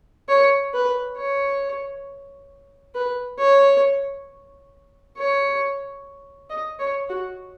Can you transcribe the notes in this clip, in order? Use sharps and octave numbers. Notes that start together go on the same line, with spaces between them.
C#5
B4
C#5
B4
C#5
C#5
D#5
C#5
F#4